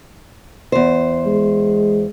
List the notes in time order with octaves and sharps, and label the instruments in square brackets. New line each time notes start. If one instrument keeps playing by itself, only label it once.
[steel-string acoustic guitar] E2 C5
[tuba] G#3